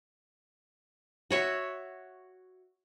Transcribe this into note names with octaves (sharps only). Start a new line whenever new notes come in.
F#4 C#5 E5